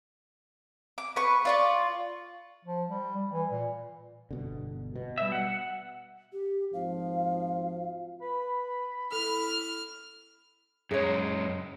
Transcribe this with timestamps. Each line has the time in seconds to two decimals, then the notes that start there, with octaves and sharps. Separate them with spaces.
0.98 D6
1.16 B4 C#6
1.45 F4 D5 C#6
2.65 F3
2.88 G3
3.16 G3
3.32 E3
3.51 A#2
4.31 G1 B2 D3
4.96 B2
5.18 G3 E5
5.32 F#5
6.32 G4
6.73 G#1 F3 F5
8.22 B4 B5
9.12 E4 A4 F6
10.91 F#2 G#3 G#4 C#5